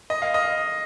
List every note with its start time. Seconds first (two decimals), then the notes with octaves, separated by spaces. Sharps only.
0.10 D#5
0.22 F5
0.34 D#5